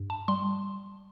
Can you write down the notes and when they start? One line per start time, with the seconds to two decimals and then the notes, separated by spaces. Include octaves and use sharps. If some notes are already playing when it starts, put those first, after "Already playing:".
Already playing: G2
0.10 A5
0.28 G3 C6